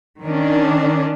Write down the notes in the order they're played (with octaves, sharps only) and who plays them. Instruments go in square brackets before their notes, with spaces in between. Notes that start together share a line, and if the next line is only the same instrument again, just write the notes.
[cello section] D#3 C#4 D4